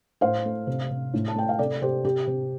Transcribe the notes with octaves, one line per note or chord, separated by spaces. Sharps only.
A2 C5 F5
A3
C3
C3
A2
A5
A3 G5
F5
C3 A4 D5
C3 G4 C5
C3 G4
C3